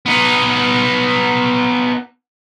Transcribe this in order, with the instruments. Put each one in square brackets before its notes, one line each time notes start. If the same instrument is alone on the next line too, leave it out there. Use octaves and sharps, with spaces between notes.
[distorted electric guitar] B3 D#4